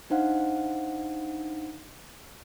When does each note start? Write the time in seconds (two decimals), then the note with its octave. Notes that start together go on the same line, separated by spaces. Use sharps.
0.10 D4 D#4 C5 F5 F#5